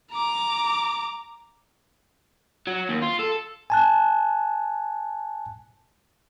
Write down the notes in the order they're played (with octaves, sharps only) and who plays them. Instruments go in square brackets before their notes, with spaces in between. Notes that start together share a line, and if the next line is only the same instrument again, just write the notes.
[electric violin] A#5 D6
[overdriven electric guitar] F#3
D#2
F4
A4
[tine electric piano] G#5 A5 F#6